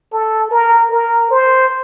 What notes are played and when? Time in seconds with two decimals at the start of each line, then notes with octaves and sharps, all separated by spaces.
0.13 A4
0.51 A#4
0.92 A#4
1.31 C5